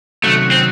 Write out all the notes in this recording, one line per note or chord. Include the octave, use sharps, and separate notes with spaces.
C3 D#3 F#3 A3 C#4 F#4
C4